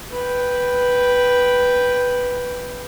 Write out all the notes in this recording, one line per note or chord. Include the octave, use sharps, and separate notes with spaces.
B4 G5